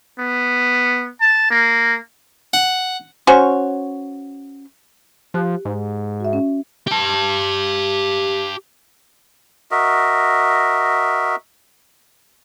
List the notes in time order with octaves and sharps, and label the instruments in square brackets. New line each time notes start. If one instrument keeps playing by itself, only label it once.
[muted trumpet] B3
A5
A#3
[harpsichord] F#5
[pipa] C#4 F#4 C5 C#5
[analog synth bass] F3 [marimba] G4 F#6
[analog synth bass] G#2
[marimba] F#4 E5
C#4
[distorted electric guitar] G4 A5
[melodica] F#4 A#4 D#5 E5